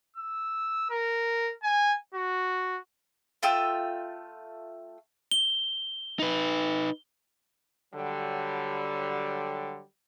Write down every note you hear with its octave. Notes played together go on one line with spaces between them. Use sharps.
E6
A#4
G#5
F#4
A3 F4 G5 E6
G7
D#4 B4
D3 F#3 G3